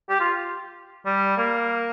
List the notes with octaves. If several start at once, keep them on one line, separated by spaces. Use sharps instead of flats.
G4
F4
G3
A#3